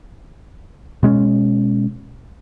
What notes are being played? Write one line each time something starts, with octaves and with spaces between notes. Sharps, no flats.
B2 G#3 C#4